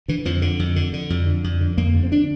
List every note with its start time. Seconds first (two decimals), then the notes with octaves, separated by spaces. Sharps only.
0.08 D3 E3
0.25 F2 F3
0.42 D3
0.59 F2
0.76 D3
0.93 D3
1.10 F2
1.26 D3
1.44 F2
1.61 D3
1.77 F2 A#3
1.94 D3
2.03 C4
2.12 D4